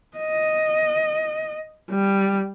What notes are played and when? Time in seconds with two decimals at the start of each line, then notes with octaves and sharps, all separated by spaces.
0.17 D#5
1.91 G3